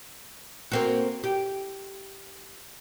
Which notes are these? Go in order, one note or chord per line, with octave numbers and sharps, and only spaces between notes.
A#3 C4 F#4
G4